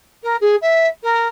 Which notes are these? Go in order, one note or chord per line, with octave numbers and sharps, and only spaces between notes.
A#4
G#4
E5
A#4